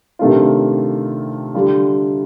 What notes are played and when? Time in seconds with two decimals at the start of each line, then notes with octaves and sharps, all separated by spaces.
0.19 C3 D#3 A3 D4 F4
1.54 D3 G3 D4 F4